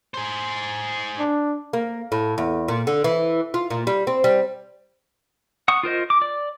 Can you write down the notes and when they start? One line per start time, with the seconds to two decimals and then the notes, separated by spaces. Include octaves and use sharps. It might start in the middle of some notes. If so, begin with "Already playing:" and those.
0.14 G#4 C5
1.19 D4
1.73 A#3
2.12 A2
2.38 E2
2.68 A#2
2.87 D3
3.04 E3
3.54 F4
3.70 A#2
3.87 G3
4.07 C4
4.24 G3
5.68 F#5 C#6 D#6
5.83 F4 A#4 C5 D#5
6.10 D6
6.22 D5